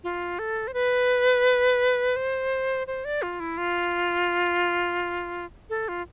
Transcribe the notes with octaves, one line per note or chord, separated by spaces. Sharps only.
F4
A4
C5
B4
C5
C5
D5
F4
E4
F4
A4
F4